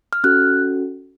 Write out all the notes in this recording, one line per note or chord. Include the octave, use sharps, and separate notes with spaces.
F6
C#4 F#4 A4 F#6